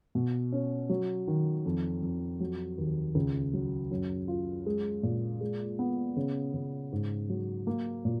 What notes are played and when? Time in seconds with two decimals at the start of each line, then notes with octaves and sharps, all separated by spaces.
0.15 B2
0.52 C#4
0.89 F#3
1.27 D#3
1.66 F2
2.03 F2
2.40 F#3
2.78 D#2
3.15 C#2
3.53 F#3
3.91 F#2
4.28 F4
4.66 G#3
5.03 A#2
5.41 G#3
5.79 B3
6.17 C#3
6.54 C#3
6.92 G#2
7.29 F#3
7.67 A#3
8.05 A#2